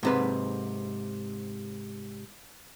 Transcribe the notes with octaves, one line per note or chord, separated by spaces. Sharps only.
G#2 C3 B4